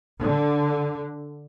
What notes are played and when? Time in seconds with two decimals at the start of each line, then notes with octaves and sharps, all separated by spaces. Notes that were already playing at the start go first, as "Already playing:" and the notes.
0.20 D3